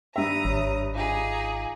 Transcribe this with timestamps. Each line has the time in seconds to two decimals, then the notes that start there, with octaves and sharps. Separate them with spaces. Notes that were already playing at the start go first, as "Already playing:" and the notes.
0.16 G2 E5 A#5 D#6
0.45 G#1 C#5
0.94 D#4 F4 G#4 F5 D6